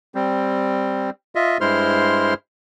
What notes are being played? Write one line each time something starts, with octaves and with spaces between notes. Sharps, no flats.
G3 C4
F4 D#5 E5
G2 G#3 E4 C5 C6 F6